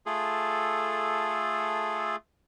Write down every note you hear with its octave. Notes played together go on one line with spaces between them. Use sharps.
A3 F4 G#4 A4